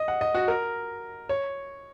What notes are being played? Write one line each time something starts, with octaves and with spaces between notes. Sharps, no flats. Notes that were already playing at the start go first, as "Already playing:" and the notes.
Already playing: D#5
F#5
D#5
F#4
A#4
C#5